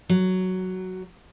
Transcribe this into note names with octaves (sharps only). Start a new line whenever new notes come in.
F#3